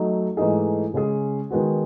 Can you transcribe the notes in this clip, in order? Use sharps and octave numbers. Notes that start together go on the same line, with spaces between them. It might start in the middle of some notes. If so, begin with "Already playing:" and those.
Already playing: F#3 A3 D#4
G#2 E3 A3 D#4 G#4
C#3 G#3 C#4 G#4
D#3 G#3 B3 F#4